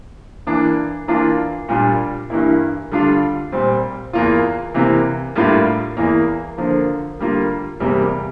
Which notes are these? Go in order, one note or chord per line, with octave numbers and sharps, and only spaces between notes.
E3 A#3 D4
E3 A#3 D4 F4
A#2 G3 A#3 D4 F4
G2 E3 A#3 E4
D3 G3 D4 F4
A#2 G3 C4
E2 E3 A#3 F4
C3 E3 A#3
A2 G3 A#3 D4 F4
E2 E3 A#3 E4
D3 F3 A#3
D3 G3 A#3 F4
E2 C3 G3 A#3